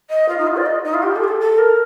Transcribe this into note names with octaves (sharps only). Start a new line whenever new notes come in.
D#5
F4
D#4
F4
D5
D#5
D#4
F4
G4
A4
G4
A4
A4
A#4